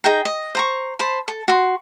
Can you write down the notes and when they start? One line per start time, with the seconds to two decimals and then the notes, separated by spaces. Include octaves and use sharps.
0.04 D#4 G#4 G5 A#5
0.25 D#5
0.55 C5 A#5 C#6
0.99 C5 A5 B5
1.28 A4
1.48 F#4 C6